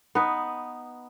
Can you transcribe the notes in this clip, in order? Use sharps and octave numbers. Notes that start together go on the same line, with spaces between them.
B3 D#4 B4